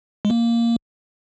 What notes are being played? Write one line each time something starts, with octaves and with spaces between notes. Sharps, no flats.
G#3
A#3